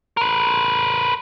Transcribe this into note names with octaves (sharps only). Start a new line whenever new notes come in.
A#4 B4